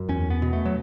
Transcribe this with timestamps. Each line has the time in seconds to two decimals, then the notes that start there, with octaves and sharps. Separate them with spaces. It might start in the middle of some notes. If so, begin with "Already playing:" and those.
Already playing: F#2
0.09 E2 C#4
0.30 B3
0.42 B2
0.53 A3
0.66 F#3